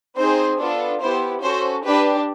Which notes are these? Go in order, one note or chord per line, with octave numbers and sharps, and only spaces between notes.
C4 D#4 G#4 C5
B3 D4 F4 A4
B3 E4 G4 C5
C#4 F#4 A4 C5
D4 G4 B4